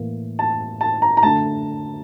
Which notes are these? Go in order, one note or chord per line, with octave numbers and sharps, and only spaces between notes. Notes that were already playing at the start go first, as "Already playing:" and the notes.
Already playing: A2 E3 A#3
A5
A5
A#5
A#5
D3 A3 A5